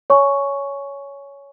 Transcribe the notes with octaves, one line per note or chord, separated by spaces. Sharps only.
C#5 G#5 C#6